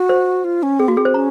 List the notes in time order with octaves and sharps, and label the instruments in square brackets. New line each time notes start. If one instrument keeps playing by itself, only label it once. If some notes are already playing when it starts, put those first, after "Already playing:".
Already playing: [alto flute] F#4
[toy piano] C5
[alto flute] F4
C#4
[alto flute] C4 [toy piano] G#4
[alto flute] A#3 [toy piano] F#4
[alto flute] C4 [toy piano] G#4
[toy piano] C5
[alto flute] C#4 [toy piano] A#5